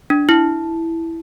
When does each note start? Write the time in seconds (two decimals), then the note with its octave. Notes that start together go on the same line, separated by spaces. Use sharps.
0.10 D4
0.29 E4